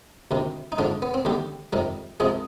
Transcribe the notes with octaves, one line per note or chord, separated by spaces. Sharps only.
D2 C3 D#3
D#4
G#2 D3 F3 D4
B3
C4
D#2 D3 G3 G4
F2 C3 D#3 G3
C2 C3 F3 G#3 G#4